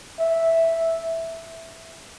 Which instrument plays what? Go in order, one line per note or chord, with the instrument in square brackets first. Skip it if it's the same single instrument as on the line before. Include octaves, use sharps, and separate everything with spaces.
[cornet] E5